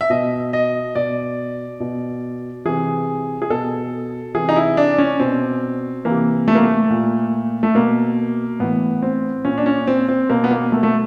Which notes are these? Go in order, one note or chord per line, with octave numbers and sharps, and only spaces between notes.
E5
B2 D#5
D#5
B2 D5
B2
C3 E3 G#4
G#4
B2 A4
C3 E3 G#4
D#4
E4
D4
C#4
B2 C4
C3 E3 A#3
A3
A#3
A3
A#2
A3
B2 A#3
A2 E3 B3
C4
A#2 C#4
D4
C#4
C4
C4
B2 A#3
B3
A#3
A3
A3